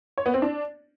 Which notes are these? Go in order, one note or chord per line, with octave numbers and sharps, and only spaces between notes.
C#5
B3
C4
D4